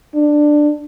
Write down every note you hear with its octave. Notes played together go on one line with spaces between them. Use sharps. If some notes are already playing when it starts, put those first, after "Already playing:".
D4